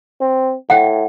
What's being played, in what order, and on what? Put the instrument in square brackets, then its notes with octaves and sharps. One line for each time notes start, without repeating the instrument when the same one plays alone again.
[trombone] C4
[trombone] A2 [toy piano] F#5 G5